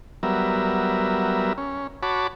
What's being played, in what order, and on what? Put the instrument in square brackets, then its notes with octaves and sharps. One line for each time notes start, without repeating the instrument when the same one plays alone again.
[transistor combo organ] F#3 G3 B3 A#4 E5
C#4
F#4 C#5 A5 B5 D6